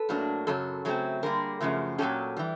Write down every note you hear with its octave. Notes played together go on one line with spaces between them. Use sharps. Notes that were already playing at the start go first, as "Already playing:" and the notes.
Already playing: A4 B4
A2 F#3 A#3 D4
F#2 C#3 F#3 A4
C#3 F#3 A3 C4
D3 G3 A#3 G#4 A#4
F#2 C#3 F3 A3
A#2 F#3 A3 C#4 G4 A4
E3 G3